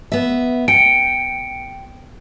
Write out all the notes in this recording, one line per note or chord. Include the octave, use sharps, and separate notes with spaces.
B3 E5
G5 C#7 D7